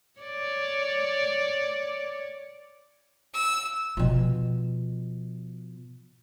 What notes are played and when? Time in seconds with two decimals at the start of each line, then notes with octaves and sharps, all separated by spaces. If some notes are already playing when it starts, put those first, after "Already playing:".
0.20 C#5 D5
3.34 E6
3.97 B2 F3